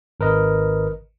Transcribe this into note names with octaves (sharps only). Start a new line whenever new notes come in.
G#1 A#4 B4 D#5